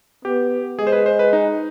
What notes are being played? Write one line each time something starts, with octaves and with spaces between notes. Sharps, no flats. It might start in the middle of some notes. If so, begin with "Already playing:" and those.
B3 G4
G#3 G#4
C5
B4
C5
B4
D#4